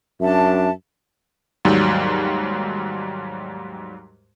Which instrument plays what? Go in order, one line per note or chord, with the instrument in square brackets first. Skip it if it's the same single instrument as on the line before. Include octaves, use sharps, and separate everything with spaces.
[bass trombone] F#2 [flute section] D4 E5 A5
[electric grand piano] D#2 G#2 F#3 G3